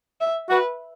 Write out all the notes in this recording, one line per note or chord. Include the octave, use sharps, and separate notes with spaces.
E5
F#4 B4